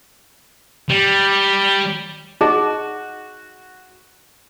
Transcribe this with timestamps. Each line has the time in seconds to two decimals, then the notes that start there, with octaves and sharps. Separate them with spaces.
0.89 G3
2.41 D#4 F#4 G#4 D#5